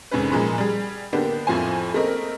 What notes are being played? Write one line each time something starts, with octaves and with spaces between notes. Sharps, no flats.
F1 G#2 D#3 C#4 B4
A#2 F3 G#3 A#5 B5
G3 G#4
D3 A#3 B3 D4 G4
F2 A2 F3 F4 C5 G#5
A3 A#3 C4 A#4 D#5